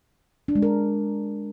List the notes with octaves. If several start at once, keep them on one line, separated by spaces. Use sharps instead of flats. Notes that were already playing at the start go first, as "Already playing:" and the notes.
D4
G#3
A#4